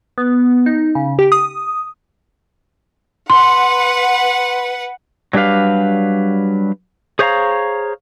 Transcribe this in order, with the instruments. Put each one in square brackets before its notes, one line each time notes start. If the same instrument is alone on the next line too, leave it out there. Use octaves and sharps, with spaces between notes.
[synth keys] B3
D#4
C#3
G4
D#6
[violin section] B4 F#5 [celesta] C6
[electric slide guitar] F#3 G3 D4 G4 B4 F5
G#4 C5 C#5 E5 F5 A#5